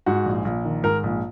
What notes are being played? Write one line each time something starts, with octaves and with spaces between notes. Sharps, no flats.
G#2 F#4
A#1
A#1
D#3
G#2 A#4
A#1